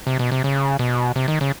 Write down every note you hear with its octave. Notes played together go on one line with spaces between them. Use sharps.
C3
B2
C3
C#3
B2
C3
D#3
C#3